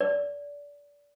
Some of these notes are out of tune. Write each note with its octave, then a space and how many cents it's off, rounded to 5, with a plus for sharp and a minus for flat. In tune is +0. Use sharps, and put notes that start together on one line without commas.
D5 -25